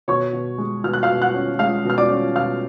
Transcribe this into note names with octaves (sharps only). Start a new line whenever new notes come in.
B2 C#5 C#6
B2
G#3
B2 F6
F#6
F5 F6
B2
F#5 F#6
C#4
G#3 F5 F6
B2 F6
D5 D6
C#4
B2 F5 F6